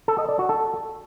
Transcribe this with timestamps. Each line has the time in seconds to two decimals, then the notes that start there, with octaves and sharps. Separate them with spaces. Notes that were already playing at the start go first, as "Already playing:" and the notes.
0.08 A4
0.18 D#5
0.29 D5
0.39 F#4
0.49 A4